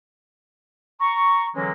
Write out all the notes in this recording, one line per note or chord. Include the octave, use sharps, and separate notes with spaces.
A#5 C#6
D3 E3 F#3 G#3 A#3 C#4